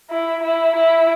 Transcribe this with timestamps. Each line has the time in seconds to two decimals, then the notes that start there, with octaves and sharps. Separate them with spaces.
0.10 E4
0.43 E4
0.76 E4